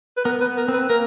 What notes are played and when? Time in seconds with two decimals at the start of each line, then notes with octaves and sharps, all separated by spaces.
0.17 B4
0.25 B3 A#4
0.41 B4
0.46 B3
0.57 A#4
0.68 C4
0.73 B4
0.89 A#3 A#4